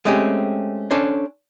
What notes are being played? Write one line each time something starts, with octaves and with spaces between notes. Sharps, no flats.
G#3 A3 C4 C#4 G4
C#4 D4 A4 C5 C#5